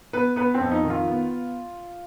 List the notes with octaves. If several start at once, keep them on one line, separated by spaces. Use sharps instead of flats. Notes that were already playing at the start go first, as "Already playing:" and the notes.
B3 B4
B3 B4
C4
F2
D#4
D#3
F4
B3